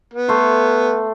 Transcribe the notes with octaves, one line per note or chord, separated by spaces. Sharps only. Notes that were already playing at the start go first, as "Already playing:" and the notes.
B3
A3 C6